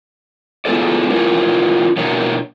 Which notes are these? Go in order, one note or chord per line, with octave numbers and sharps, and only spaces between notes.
G#3 B3 E4 F4 A4 D5
C#4 E4 F4 A#4 C#5
B2 A#3 D4 E4 A#4 C#5